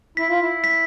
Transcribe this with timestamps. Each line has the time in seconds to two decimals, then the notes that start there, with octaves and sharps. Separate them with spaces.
0.17 E4 B6
0.29 F4
0.40 E4
0.64 B6